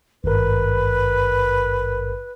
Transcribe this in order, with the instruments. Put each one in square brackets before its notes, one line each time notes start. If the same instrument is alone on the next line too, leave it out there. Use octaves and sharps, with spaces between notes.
[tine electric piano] G#1 G2 A#4 [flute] B4